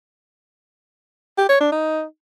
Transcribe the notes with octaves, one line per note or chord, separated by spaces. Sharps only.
G4
C#5
D4
D#4